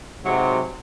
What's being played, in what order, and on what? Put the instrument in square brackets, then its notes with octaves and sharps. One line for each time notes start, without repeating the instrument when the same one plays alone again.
[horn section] G#2 C3 F#3